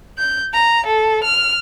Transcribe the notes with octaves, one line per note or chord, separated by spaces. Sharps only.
G6
A#5
A4
F6